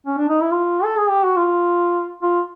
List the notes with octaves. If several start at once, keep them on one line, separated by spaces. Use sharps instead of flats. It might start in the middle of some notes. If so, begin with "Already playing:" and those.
C#4
D4
D#4
E4
F4
A4
G#4
G4
F#4
F4
F4